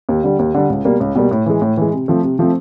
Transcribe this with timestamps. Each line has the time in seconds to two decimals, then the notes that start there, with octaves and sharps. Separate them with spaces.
0.09 D#2
0.24 D3 G3
0.39 D#2
0.54 D3 G3
0.70 C#2
0.85 B2 G3 A#3
1.00 C#2
1.15 B2 G3 A#3
1.31 A2
1.46 E3 G#3
1.62 A2
1.77 E3 G#3
1.93 C3
2.08 F3 A3 C4
2.23 C3
2.39 F3 A3 C4